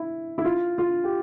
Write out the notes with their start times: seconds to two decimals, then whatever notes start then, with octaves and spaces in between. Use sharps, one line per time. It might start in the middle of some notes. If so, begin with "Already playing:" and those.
Already playing: E4
0.38 E4
0.45 F4
0.78 F4
1.04 G4